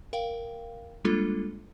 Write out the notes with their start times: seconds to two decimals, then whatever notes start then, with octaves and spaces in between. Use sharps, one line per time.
0.13 A#4 F5 G5
1.05 G3 G#3 A#3 D4 F4 A4